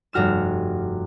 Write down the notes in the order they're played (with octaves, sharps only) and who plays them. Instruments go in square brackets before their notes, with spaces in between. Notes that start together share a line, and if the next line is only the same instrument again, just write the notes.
[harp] F1 G2 F#4 F6 E7